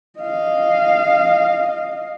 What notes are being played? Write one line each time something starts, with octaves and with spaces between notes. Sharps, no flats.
D#5 F5